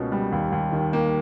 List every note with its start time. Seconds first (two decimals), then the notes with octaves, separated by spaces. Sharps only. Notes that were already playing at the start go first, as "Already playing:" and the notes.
Already playing: C#2 B2 A#3 C#4
0.12 G3
0.32 D#2
0.52 D#2
0.72 D#3
0.93 A#3